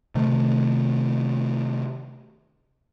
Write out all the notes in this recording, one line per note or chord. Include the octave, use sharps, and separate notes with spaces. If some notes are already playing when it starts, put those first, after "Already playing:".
C3 D#3 A3